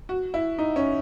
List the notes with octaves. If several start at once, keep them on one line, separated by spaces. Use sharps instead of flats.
F#4
E4
D#4
C#4